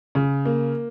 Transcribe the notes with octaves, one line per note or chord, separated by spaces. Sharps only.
C#3
A#3